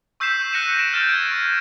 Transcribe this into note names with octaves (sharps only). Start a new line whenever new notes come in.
C#6 E6 G6 B6 C7 E7
F#6 A#6 C#7 D#7 E7
G6 A#6 D7 E7
F6 G6 A6 E7 F7
G#6 D7
C#6